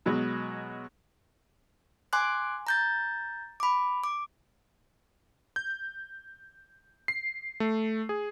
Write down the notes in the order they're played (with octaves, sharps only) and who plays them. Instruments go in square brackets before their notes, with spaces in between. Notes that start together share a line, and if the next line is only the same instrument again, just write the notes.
[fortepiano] B2 F#3 G#3
[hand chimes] G#5 C6 D6 F#6
A#5 G6 A6
B5 D6
D6
[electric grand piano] G6
C7
A3
G#4